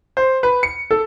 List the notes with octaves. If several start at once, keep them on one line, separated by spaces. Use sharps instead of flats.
C5
B4
C#7
A4